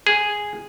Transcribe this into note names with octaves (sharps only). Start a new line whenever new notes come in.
G#4